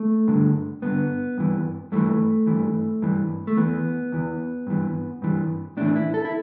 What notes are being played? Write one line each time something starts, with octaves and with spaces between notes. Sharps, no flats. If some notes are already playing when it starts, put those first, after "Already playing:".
Already playing: A3
G2 D3
G2 D3 B3
G2 E3
G2 E3 A3
G2 E3
G2 E3
A3
E2 E3 B3
E2 E3
G2 E3
G2 E3
A2 E3 D4
E4
A4
E4